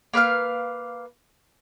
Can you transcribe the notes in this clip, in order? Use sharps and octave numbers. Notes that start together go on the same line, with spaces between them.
A#3 B4 F5 F6